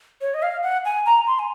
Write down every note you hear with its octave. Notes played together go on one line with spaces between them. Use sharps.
C#5
D#5
F5
F#5
G#5
A#5
C6
G#5